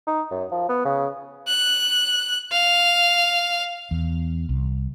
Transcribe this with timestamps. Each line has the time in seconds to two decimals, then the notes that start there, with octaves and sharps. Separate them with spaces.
0.07 D#4
0.31 F#2
0.51 F3
0.69 B3
0.85 C#3
1.48 F#6
2.52 F5
3.91 E2
4.49 C2